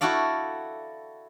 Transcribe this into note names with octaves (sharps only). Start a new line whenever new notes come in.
E4 F#4 A4 D5 F5